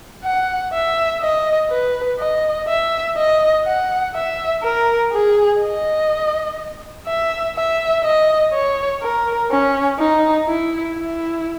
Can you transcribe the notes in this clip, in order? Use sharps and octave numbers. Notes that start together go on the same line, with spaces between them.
F#5
E5
D#5
B4
D#5
E5
D#5
F#5
E5
A#4
G#4
D#5
E5
E5
D#5
C#5
A#4
C#4
D#4
E4
E4